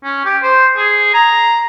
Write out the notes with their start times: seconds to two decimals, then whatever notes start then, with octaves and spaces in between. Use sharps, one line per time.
0.04 C#4
0.25 G4
0.43 C5
0.77 G#4
1.14 A#5